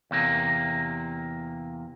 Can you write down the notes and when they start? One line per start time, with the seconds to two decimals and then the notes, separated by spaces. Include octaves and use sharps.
0.11 E2 C3 A#3